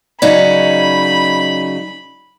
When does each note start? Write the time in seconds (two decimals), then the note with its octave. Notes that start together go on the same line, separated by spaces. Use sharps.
0.22 C#3 F#3 D#4 D5 D#5 B5